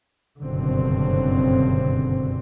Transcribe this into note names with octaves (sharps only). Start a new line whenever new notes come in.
F#1 G2 B2 D3 C4